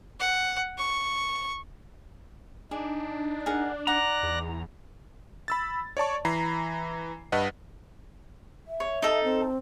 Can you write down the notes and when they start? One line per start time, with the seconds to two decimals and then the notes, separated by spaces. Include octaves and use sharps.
0.20 F#5
0.78 C#6
2.71 D4 D#4 G#4
3.46 G#4 A#4 F#5
3.87 D#4 D5 F#5 A#5 D#6 F#6 A#6
4.23 E2
5.48 B5 E6 A6
5.97 C#5 D5 A5 C#6
6.25 E3 A#5 B5 C7
7.32 G2 B4 D#5 F#5
8.68 E5
8.80 C#5
9.02 D#4 A4
9.24 C4